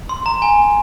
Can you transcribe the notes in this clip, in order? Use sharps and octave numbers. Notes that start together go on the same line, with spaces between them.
C6
A#5
G#5